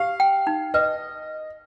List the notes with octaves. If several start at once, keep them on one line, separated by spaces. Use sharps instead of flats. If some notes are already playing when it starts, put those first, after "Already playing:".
Already playing: G4 F5
G5
D#4
B4 D#5